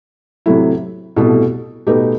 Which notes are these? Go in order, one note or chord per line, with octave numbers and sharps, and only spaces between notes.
C3 F#3 A3 E4
C2 B2 A3 E4 A4
B2 A3 D#4 G4 B4